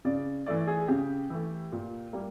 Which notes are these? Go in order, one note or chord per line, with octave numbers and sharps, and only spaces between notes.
C#3 D5
E3 A3 D5
G#4
C#3 G4
E3 A3
A#2
G3 A#3